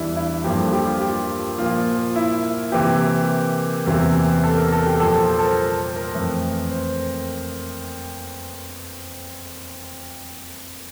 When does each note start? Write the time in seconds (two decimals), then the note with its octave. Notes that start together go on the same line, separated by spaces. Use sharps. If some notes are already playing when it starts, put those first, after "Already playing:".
Already playing: E2 E3 G3 D4 E4
0.16 E4
0.44 G2 F3 A#3 G4
0.59 A4
0.73 G4
0.87 F4
1.01 G4
1.58 A#2 F3 A#3 F4
2.16 E4
2.72 C3 E3 A#3 G4
3.86 E2 C3 E3 A#3
4.43 A4
4.58 A#4
4.72 A4
4.87 G4
5.00 A#2 F3 A#3 A4
5.15 A4
5.29 C5
5.39 A4
5.43 A#4
5.57 A4
5.96 A#4
6.15 F2 E3 A3
6.71 C5